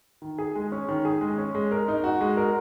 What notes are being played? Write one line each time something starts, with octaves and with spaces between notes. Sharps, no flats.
D#3
G#4
G#3
C#4
D#3
G#4
G#3
C#4
G#3
A#4
D#4
F#4
G#3
A#4